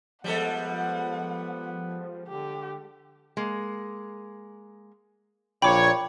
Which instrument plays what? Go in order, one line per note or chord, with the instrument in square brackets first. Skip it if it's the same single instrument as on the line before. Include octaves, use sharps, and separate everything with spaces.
[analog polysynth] F3 [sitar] G3 G#3 A4 [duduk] B3 [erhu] F#5
[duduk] D3 [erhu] G4
[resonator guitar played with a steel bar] G#3 A#3
[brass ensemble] A#1 A#2 C#5 [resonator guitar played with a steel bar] G5 [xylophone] B5 D6